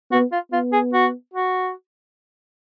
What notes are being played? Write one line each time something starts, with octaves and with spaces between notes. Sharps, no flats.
B3 F#4
F4
B3 F4
G#4
F#4
F#4